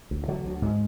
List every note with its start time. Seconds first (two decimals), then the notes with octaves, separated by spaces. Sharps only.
0.11 D2
0.28 D3 F#3
0.45 D2
0.62 G#2 G#3